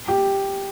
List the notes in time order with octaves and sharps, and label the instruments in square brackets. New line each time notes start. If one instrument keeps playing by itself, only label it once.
[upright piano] G4